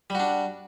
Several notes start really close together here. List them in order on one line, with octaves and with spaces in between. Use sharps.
G3 F#4 D4